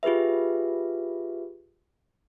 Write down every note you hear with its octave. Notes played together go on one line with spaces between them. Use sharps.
F4 G4 G#4 B4 E5